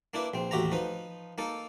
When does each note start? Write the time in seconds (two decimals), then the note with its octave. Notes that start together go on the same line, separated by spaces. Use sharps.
0.14 A#3 D4 E4 B4
0.34 A#1 C4
0.51 A1 D#2 F#4 G4 E5 A#5
0.72 F3 D#4 B4
1.38 A#3 D#4 A4